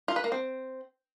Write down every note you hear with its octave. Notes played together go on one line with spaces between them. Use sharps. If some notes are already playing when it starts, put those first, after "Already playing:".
F4
B4
A#3
C4